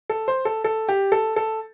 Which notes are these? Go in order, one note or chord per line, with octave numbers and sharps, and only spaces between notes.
A4
C5
A4
A4
G4
A4
A4